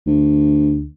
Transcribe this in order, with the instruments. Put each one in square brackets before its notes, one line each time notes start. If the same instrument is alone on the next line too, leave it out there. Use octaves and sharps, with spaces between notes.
[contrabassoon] D2